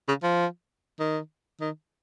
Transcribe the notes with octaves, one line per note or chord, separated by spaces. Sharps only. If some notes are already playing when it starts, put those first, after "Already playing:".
C#3
F3
D#3
D#3